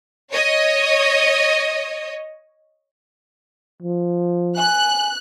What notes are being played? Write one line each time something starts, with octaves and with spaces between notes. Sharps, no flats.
C#5 D#5
F3
G#5 F#6